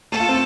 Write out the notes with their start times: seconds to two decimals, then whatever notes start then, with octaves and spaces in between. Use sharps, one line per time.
0.12 A3 A4
0.20 F4
0.29 C4